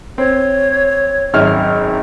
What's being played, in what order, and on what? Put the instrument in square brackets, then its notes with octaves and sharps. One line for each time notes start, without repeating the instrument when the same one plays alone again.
[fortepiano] C4 [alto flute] C#5
[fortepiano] G#1 F#2 F6